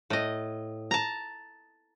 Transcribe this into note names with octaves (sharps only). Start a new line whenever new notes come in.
A2 D#5
A5 A#5